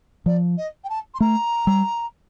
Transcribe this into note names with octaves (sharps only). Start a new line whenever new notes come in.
F3 D5
D#5
G5
A5
C6
A3 A#5
G3